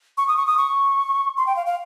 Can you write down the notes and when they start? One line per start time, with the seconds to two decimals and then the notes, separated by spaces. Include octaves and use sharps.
0.18 C#6
0.28 D#6
0.37 C#6
0.47 D#6
0.58 C#6
1.37 C6
1.46 G5
1.56 F5
1.66 F5